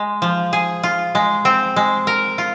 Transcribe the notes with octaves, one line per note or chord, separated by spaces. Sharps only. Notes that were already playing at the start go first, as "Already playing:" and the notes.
Already playing: G#3
F3
G#4
F4
G#3
C4
G#3
A#4
F4